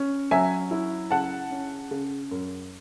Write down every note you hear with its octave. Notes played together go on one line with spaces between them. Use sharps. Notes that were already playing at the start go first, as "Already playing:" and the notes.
Already playing: C#4
F#3 E5 G#5
E4
C#3 F#5 A5
C#4
C#3
F#2